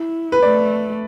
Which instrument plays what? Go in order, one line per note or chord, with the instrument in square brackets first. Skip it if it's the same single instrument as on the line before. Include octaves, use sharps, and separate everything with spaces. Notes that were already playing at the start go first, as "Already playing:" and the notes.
Already playing: [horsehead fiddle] E4
[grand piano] B4
[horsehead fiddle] A3 [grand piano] D5